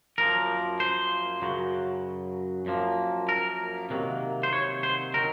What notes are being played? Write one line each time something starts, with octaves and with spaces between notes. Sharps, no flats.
F#2 F3 A#3 A#4
C5
F#2 C#3 F#3
F#2 F3 A#3
A#4
C3 D#3 F#3 A#3
C5
C#5
C5
D#3 F#3 A#4